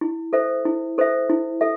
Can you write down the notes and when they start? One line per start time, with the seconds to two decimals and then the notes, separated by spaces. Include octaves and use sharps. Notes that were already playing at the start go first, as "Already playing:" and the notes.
0.01 E4
0.33 A4 C5 E5
0.65 E4
0.98 A4 C5 E5
1.30 E4
1.61 A4 E5